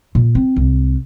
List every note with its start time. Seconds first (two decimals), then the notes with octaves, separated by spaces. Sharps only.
0.15 A#2
0.35 C4
0.56 C2